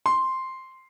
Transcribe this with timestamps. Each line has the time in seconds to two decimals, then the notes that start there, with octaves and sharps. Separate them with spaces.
0.06 C6